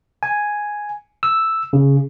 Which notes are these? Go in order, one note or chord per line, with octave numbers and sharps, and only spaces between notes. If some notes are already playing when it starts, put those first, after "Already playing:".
G#5
E6
C#3